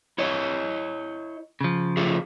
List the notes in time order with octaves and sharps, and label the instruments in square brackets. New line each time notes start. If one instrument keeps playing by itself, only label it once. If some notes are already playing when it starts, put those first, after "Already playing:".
[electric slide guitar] E4 C#5 D#5
[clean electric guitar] C#3 F3
[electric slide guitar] A3 F4 G#4